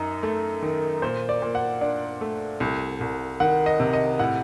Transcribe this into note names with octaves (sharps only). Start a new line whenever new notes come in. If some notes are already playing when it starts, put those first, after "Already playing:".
Already playing: F#2 D#4
A3
D#3
A#2 C5
D5
A#2
F#5
D4
A3
C2
C2
D#3 F#5
D#5
C3
D#5
A2 F#5